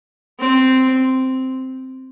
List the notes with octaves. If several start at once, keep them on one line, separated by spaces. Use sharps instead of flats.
C4